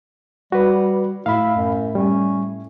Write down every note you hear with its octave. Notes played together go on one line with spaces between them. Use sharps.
G3 F#4 B4
A2 E4 F5 B5
F#2
G3 C#4